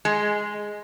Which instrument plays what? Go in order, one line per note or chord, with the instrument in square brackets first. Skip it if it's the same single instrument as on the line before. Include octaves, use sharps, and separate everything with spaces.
[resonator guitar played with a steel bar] G#3